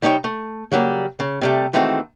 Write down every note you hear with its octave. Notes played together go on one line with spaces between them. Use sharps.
C2 G3 D#4 C#5 G5
A3
C#3 F#3 G3 A#3
C#3
C3 G3 A3
D#3 E3 G#3 A3 C4 F#4